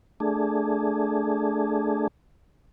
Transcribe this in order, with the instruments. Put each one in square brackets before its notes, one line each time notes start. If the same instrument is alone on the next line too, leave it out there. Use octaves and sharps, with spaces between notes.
[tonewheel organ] A3 D4 G#4